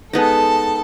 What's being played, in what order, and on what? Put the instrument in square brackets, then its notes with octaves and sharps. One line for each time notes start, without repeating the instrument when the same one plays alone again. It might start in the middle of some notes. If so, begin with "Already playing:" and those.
[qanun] G#3 B3 D#4 [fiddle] A4 A5